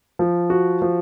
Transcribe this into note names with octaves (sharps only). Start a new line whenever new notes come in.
F3
F#4
F3